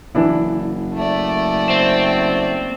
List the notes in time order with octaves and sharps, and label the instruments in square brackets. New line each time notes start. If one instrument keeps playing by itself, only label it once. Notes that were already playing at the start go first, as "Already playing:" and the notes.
[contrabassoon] F#1 [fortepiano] E3 D4 E4
[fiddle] A3 D5
[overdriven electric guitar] C4